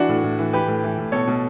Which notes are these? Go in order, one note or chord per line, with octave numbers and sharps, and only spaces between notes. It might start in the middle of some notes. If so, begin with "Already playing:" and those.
Already playing: E3 D4 F#4
A2
A2
E3
E3 G4 B4
A2
E3
A2
B2 A4 C#5
B2